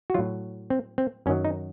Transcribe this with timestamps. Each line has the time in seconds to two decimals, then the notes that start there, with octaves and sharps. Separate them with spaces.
0.10 F#4
0.14 A2 F#3 F4
0.70 C4
0.98 C4
1.26 F#2 D#3 F#3 C#4
1.45 D#4